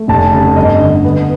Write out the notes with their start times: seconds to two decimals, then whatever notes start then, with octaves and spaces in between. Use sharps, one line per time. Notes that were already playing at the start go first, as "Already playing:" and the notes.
Already playing: A3
0.08 F1 A5
0.19 G#5
0.29 A5
0.33 C#3
0.56 G1 D#5
0.80 D3
1.05 B3